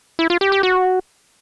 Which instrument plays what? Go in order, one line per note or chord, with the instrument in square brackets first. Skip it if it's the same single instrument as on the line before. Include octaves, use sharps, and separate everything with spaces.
[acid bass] E4
F4
G4
G4
F#4